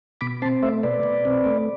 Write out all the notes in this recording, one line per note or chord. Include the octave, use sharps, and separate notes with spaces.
B2 B5 D6
C4 A5 C6
A3 C5 E5
B2 B4 D5
B2
C4
A3